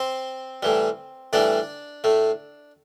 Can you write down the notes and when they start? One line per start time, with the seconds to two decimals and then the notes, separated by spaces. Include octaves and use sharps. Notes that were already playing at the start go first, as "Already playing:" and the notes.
Already playing: C4 C5
0.63 A2 E3 G3
1.33 A2 E3 G3 D4 D5
2.04 A2 A3